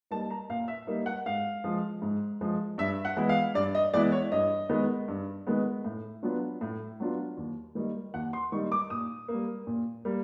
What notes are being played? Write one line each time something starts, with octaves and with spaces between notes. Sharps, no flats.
G3 A#3 D#4 A5
A#5
A#2 F5
E5
G3 A#3 D#4
F#5
G#2 F5
F3 G#3
G#2
F3 G#3
G2 E5
F#5
E3 G#3 B3 E4
F5
G2 D5
D#5
E3 G#3 B3 E4 D5
C#5
G2 D#5
D#3 G#3 B3
G2
D#3 G#3 B3
A2
F#3 B3 D4 F4
A2
F#3 B3 D4 F4
D#2
D#3 G3 A#3 D#4
D#2 F#5
C6
D#3 G3 A#3 D#4 C#6
D6
A#2 D#6
G3 A#3
A#2
G3 A#3